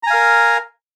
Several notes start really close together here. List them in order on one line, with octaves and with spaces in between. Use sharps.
A#5 G#5 F5 A#4